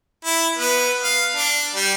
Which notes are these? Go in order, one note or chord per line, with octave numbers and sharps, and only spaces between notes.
E4
B3
F5
D4
G3